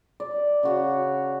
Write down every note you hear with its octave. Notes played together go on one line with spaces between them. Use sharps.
D5
C#3 F#4 C#5